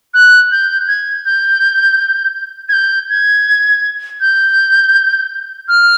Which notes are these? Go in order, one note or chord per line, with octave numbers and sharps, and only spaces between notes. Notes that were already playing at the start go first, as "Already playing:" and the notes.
F#6
G6
G#6
G6
G#6
G6
G#6
G6
F6